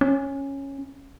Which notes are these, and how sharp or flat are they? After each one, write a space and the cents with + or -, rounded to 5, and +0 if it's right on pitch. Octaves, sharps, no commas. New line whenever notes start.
C#4 -10